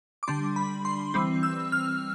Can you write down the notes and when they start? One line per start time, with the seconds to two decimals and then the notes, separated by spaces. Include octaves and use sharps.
0.23 D6
0.28 D3 G3 D4 C6
0.56 B5
0.85 C6
1.14 E3 G3 C4
1.43 E6
1.72 F6